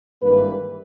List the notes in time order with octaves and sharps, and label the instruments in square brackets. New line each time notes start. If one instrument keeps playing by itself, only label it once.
[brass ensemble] G#1 G2 E3 G3 A#3 B4